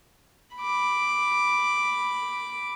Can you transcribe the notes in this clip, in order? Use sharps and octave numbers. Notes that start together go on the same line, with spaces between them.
B5 D6